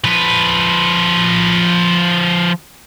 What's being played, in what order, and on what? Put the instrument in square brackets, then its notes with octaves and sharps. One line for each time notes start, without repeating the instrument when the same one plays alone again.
[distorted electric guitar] F3 B4